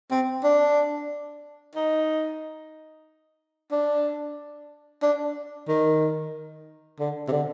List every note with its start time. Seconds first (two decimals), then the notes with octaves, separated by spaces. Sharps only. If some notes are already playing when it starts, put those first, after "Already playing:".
0.11 C4
0.44 D4
1.75 D#4
3.72 D4
5.02 D4
5.68 D#3
7.00 D3
7.28 C3
7.32 D3